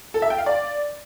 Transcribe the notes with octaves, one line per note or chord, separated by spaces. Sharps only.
A4
E5
G5
F5
D5